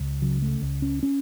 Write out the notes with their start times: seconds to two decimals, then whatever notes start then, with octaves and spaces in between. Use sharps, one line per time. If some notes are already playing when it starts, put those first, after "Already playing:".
Already playing: C#2
0.22 C#3 F#3
0.42 A3
0.62 C#2
0.82 C#4
1.03 C#4